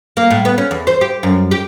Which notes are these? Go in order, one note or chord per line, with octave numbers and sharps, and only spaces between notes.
A#3
A2
B3
C#4
E2
C5
G4
F#2
G4